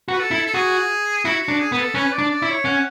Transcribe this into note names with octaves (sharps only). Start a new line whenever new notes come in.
F#4
B4
A4
E4
A4
F#4 G#4
E4 F#4
F#4
D4
G#4
B3 G#4
A4
C#4 B4
D5
D4
D5
E4
C#5
C#4 F#5